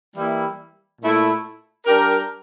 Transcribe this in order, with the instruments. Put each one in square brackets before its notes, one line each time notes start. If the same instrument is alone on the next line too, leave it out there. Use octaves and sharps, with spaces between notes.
[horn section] E3 G3 A#3 E4
A#2 A3 E4
G3 D4 G4 A#4